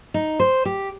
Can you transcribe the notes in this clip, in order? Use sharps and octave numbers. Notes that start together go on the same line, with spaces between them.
D#4
C5
G4